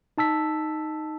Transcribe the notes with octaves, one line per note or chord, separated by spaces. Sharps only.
D#4 A5 E6 B6